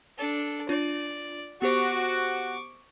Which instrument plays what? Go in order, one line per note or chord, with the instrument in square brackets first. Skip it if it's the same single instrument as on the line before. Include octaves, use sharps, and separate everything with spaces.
[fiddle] D4 A4
[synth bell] D4 F4 [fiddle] D5
[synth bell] B3 G4 C5 [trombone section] F#4 [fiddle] C#6 D6